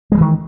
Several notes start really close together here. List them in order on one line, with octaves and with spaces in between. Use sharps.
G#3 G3 E3 D#3